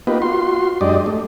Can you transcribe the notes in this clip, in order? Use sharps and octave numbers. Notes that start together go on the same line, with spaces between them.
A#3 B3 D#4 F4 G4 B4
F4 F#4 C6
F#2 G#3 D4 G4 D5 D#5
A3